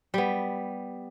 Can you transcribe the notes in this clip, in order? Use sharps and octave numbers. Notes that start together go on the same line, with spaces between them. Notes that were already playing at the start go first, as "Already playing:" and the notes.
G3 B3